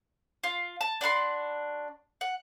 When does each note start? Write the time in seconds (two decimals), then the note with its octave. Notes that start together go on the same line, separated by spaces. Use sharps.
0.44 F4
0.81 A5
1.01 D4 F#4 B5 C6
2.21 F#5